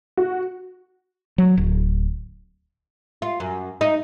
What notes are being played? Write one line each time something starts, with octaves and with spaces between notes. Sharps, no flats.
F#4
F#3
D1
F4
F#2
D#4